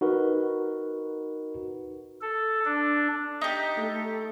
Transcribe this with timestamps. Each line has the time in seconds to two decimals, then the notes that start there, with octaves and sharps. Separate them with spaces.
0.01 D#4 F#4 A#4 B4
2.21 A4
2.65 D4
3.41 D#4 G4
3.78 A3 A4